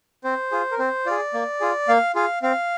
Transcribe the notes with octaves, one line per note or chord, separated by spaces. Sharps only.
C4 C5
F4 G#4
A#4
C4 C5
F4 G#4 D5
A#3
F4 G#4
A#3 F5
F4 G#4 F5
C4 F5